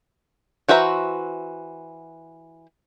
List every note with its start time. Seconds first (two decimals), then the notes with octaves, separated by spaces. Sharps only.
0.68 E3 F#4 C5 E5 A#5